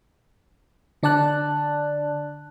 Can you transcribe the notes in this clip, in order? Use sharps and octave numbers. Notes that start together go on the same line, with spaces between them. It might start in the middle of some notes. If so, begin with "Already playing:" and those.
D3 D4 D5 A5 F#6